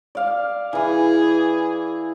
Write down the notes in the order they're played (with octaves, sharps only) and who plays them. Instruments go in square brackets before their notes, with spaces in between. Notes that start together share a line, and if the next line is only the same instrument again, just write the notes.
[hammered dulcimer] D5 F5
[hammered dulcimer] E3 E4 [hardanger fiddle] G#4